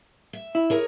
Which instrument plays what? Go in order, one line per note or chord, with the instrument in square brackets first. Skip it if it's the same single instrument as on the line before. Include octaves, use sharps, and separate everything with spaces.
[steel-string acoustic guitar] E5
[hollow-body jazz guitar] E4
[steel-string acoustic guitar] G#4 A#4 C#5